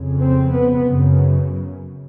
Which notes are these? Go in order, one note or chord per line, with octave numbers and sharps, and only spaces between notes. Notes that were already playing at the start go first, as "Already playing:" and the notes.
Already playing: F2 C#3
C4
B3
F#2 C#3